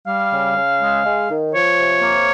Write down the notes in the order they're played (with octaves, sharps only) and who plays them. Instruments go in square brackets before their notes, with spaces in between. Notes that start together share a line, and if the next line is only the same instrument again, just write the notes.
[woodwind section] G3 F5
C#3
C#3
G#3
G#3
D#3
F3 C#5
C3
A#3